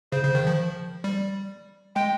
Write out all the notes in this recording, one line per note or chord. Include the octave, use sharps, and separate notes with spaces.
C#3 C5
C#3
D#3
F3
G3
G#3 G5